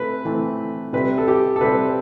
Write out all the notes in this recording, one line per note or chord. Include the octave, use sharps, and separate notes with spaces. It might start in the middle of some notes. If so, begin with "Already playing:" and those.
Already playing: A3 C4 B4
E3 A3 C4
C3 G3 C4 B4
A4
G4
A4
C3 G3 C4 B4